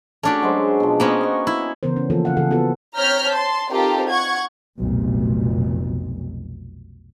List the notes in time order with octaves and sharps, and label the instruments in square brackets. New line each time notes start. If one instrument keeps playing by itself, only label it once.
[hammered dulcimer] A3 F#4 [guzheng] C#4 D4 G4
[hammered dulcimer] F#3 G#3 C5
B2 F3
[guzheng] A#3 B3 C#4 [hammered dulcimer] F#4 C5 D#5
[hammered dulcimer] D#5 C#6
[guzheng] E4
[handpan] C#3 E3 B3 A#4 C5
C#4
E3 F3 A#3 F4 A4
C#3 F5 F#5
C#3 E3 G#4 A4 F#5
B3 F4 F#4 G#4 A4
[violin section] C4 C#5 A#5 F6 G6 B6
A5 C6
C4 D#4 F4 G4 A4 A#4
F#5 C#6 G#6
[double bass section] F1 B1 A#2